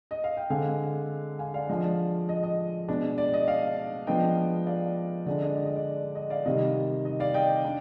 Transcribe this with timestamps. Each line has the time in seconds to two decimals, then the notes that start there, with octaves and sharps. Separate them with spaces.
0.11 D#5
0.24 F5
0.37 G5
0.50 D3 G#3 C4 F5 G#5
1.39 F5 G#5
1.54 D5 F5
1.69 F3 G#3 D4 D#5
1.84 D5
2.29 D#5
2.43 D#5
2.88 B2 G#3 D4
3.18 D5
3.33 D#5
3.48 D5 F5
4.07 F3 G#3 B3 D4 D#5 G5
4.67 D5 F5
5.26 D3 G#3 D4 D5
5.42 D#5
5.56 D5
5.66 D#5
5.76 D5
6.15 D#5
6.30 D5 F5
6.46 C3 D#3 G3 D#5
7.05 D#5
7.20 D5 F5
7.34 D#5 G5
7.65 D4